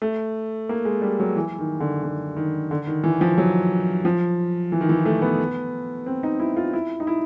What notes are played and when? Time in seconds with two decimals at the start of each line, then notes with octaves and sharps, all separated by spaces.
0.02 A3
0.69 A#3
0.85 G#3
1.02 G3
1.20 F#3
1.36 E3
1.59 D#3
1.80 D3
2.03 D3
2.36 D#3
2.71 D3
2.87 D#3
3.04 E3
3.21 F3
3.38 F#3
4.05 F3
4.72 E3
4.81 D#3
4.89 E3
5.06 A3
5.22 B3
6.06 C4
6.23 D#4
6.40 E4
6.57 F4
6.73 E4
7.00 D#4
7.07 E4